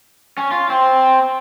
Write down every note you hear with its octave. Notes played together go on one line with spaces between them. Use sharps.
C#4
F4
C4